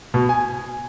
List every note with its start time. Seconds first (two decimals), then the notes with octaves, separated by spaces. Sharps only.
0.14 B2
0.29 G#5